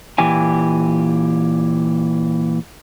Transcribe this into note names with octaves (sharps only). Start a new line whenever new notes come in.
A#2 E3 G4 G#5